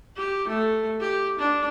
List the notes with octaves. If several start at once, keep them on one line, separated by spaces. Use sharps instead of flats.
G4
A3
G4
D4